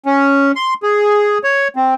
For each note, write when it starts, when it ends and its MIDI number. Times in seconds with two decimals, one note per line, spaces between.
0.06 0.52 61
0.56 0.74 84
0.83 1.38 68
1.44 1.68 73
1.76 1.94 60